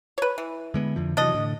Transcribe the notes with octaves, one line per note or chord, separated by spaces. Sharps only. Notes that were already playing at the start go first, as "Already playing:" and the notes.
B4 C#5
E3
D3 G#3 B3
F2 D3 F3
C3 E3 F#3 D4 D#5
A2 D3